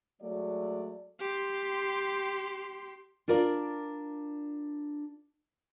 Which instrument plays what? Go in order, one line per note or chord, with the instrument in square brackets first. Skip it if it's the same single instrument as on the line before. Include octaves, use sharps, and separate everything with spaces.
[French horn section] F#3 G#3 A3 D5
[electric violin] G4 C6
[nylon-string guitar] D4 F4 A#4 D5